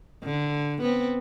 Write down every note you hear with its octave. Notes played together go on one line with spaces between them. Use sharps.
D3
B3 C4